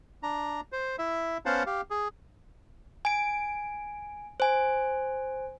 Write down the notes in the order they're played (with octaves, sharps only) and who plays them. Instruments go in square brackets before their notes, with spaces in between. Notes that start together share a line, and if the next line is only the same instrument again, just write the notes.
[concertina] D4 A#5
C5
E4 E5
B3 C#4 C5 F5 F#5 A5
G4 F5
G#4
[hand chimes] G#5 D7
C5 G#5